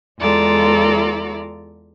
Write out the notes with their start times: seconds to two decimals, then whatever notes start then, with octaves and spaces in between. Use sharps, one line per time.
0.19 E2 G#3 F4 A4 D5 A#5